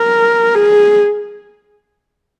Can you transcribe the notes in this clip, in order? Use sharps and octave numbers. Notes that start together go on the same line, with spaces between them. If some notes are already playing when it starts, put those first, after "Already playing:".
Already playing: A#4
G#4